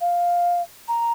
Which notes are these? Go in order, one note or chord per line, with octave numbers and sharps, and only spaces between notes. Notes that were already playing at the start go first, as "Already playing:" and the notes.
F5
A#5